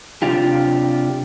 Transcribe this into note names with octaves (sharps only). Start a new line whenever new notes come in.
C3 D4 F4 G4